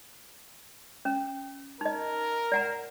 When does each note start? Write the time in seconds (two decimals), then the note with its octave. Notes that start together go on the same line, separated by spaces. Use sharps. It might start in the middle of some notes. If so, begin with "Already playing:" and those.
1.05 C#4
1.81 D#4 A#4 D#5
2.52 D5 F#5 A#5